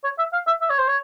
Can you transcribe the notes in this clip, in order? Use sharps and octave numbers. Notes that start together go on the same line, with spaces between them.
C#5
E5
F5
E5
E5
C#5
C5
C#5